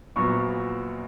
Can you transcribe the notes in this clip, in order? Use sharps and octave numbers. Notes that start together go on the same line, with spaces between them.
A#1 A#2 F#3 B3 C#6